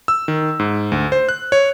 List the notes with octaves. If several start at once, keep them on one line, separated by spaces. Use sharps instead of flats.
E6
D#3
G#2
D2
C5
F#6
C#5